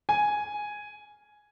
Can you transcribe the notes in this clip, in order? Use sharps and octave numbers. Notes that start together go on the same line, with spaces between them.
G#5